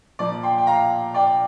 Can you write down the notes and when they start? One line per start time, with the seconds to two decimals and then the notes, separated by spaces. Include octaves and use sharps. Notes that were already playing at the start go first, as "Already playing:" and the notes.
0.19 A#2 F3 D5
0.43 G5 C6
0.58 G5
0.67 F5 A#5
1.14 D5 G5